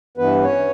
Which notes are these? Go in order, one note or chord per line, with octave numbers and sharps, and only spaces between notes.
G2 E3 B3 B4
C#4 C#5